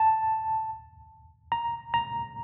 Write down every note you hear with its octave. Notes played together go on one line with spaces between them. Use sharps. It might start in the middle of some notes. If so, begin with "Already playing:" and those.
Already playing: A5
A#5
A#5